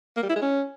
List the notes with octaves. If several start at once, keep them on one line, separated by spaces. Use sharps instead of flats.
A#3
G3
E4
G#3
C#4